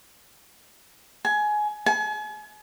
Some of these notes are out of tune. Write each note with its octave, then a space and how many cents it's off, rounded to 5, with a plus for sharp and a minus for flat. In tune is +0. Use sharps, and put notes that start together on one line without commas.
G#5 +20
G#5 +40